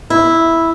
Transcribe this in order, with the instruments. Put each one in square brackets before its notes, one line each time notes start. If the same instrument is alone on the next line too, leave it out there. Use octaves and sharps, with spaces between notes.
[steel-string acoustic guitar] E4